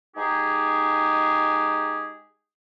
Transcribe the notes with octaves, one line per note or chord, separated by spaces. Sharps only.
G#3 D#4 G4 G#4